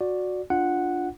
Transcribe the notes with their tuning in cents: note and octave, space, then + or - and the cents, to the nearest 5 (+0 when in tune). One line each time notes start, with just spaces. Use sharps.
F#4 -15 D5 +0
D4 +0 F4 +0 F#5 +0